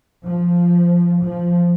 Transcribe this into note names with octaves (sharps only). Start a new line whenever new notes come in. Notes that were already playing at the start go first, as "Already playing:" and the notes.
F3
F3